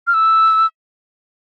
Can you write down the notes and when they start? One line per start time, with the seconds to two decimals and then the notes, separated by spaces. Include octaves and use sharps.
0.07 F6
0.14 E6